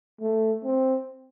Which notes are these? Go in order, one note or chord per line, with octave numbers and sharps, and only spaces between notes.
A3
C4